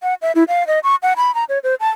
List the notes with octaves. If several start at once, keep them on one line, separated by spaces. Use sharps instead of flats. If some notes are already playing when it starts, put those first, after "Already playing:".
F#5
E5
E4
F5
D#5
C#6
F#5
B5
A#5
C#5
C5
A5